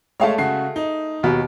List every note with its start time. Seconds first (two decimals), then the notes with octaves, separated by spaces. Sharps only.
0.20 G#3 A3 C#5 F5 A5
0.38 C#3 F#4 C7
0.76 D#4
1.23 D#2 B2